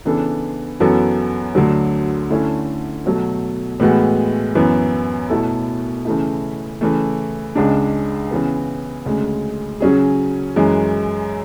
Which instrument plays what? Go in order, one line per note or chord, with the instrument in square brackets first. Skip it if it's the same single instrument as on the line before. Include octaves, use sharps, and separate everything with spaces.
[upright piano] C#3 E3 B3 D4 A4
F#2 E3 B3 F#4 A4
D2 D3 F#3
D3 A3 C#4 E4
B2 F#3 A3
A2 E3 G#3 B3 F#4
F#2 E3 B3
B2 A3 E4 A4
C#3 E3 A3 E4
C#3 E3 A3
C#2 C#3 G#3 D4
C#3 E3 B3
D2 C#3 G#3
C#3 F#3 C#4 G#4
F#2 E3 G#3